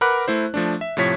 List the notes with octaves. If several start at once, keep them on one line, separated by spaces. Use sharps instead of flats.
A#4 B4 F#5 B5 D6 F#6
A3 E4 C5
F3 A3 D4
E5
A2 C3 F3 C#5 B6